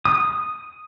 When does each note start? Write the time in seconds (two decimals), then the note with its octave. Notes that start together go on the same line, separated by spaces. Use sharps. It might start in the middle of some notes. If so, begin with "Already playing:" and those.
0.05 D#6